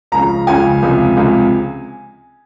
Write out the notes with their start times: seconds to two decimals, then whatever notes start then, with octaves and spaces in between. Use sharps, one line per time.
0.12 C#2 C#3 F3 A#5
0.47 C#2 C#3 F3 G#5
0.82 C#2 C3 F3
1.17 C#2 C3 F3